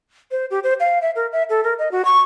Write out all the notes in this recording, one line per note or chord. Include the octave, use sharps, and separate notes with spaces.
C5
G4
C5
F5
E5
A#4
E5
A4
A#4
D#5
F#4
C#6